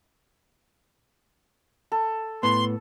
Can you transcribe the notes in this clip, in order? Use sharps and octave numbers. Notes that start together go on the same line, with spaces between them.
A4
A2 B3 C6